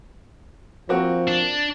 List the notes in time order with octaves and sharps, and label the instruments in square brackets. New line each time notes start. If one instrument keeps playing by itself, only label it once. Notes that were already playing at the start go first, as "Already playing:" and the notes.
[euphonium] F3 [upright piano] A#3 C4 F#4
[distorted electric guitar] D4